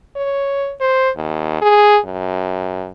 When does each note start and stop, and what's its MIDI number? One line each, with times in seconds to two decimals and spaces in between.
0.16 0.73 73
0.81 1.10 72
1.16 1.59 39
1.62 1.98 68
2.05 2.90 42